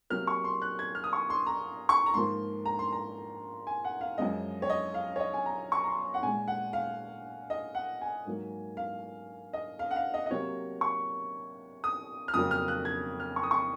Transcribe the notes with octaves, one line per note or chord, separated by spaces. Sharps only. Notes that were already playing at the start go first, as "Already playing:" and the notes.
C3 F#3 A#3 F6
C#6
C6
F#6
G#6
F6
D#6
C#6
C6
A#5
C#6
A#5
G#2 F3 A#3 C6
A#5
C6
A#5
G#5
F#5
F5
F#2 F3 G#3 D#5
C#5
D#5
F5
C#5
D#5
G#5
A#5
C#6
A#5
C6
F#5
A#2 G#3 G#5
F#5
F5
D#5
F#5
G#5
G#2 F#3 A#3
F5
D#5
F5
F#5
F5
D#5
D#5
C3 F#3 A#3 C#5
C#6
D#6
F6
F2 C#3 F#3 A#3 D#6
F6
F#6
G#6
F6
C#6
D#6
C#6